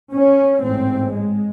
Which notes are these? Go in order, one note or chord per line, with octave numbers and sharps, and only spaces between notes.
C#4
A1 G#2 C4
G#3